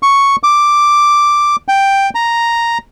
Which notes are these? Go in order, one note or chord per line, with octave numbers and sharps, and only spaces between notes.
C#6
D6
G5
A#5